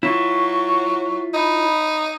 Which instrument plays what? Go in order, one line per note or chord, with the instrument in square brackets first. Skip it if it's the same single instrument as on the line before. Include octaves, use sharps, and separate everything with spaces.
[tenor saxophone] F#3 [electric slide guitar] E4 F4 [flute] C#6
[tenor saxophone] D#4 [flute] B5